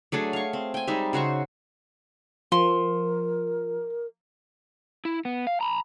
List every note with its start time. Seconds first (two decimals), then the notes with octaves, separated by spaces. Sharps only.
0.12 F#3 A3 D4 G#4
0.33 F5 C#6
0.53 C4
0.74 G5 G#5
0.87 G3 G#3 D#4 E5
1.13 C#3 F#4 C5 C#6
2.52 F3 A#4 C6
5.05 E4
5.25 B3
5.47 F5
5.61 A#5 B5